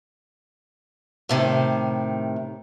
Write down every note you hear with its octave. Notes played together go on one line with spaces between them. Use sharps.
A2 C3 D#3